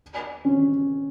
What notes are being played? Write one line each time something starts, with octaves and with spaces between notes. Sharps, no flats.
C#4